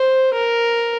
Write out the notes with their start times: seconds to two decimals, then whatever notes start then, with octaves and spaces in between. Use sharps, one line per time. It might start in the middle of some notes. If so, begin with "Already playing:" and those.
Already playing: C5
0.33 A#4